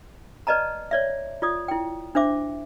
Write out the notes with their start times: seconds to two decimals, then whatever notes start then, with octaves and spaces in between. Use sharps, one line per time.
0.47 B4 D5 D#5 A5 A#5
0.91 C#5 D5 E5
1.42 F4 D5 D#6
1.68 E4 G5
2.15 D4 C5 E5 D6